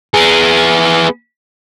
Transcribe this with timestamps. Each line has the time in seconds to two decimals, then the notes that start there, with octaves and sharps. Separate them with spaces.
0.14 B3 G#4